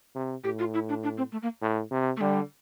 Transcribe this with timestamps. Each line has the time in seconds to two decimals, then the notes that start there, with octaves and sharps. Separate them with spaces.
0.15 C3
0.44 A2 G4
0.59 F4
0.74 E4
0.89 D4
1.03 D4
1.17 C4
1.32 A3
1.42 A#3
1.62 A2
1.91 C3
2.17 A3
2.21 D3 G3